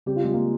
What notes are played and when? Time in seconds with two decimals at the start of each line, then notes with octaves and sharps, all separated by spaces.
0.06 C#3 G3 C4 G4
0.16 F4
0.24 G#3
0.33 A#3